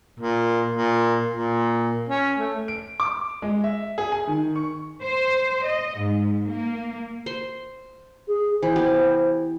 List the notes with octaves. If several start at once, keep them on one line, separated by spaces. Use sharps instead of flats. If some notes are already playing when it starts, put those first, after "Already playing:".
A#2
A#2
A#2
C#4
A3
D7
D6
G#3
E5
G#4
G#5
D#3
C#6
C5
D#5
G#2
A#3
C5 C6
G#4
E3 C5
B3 G4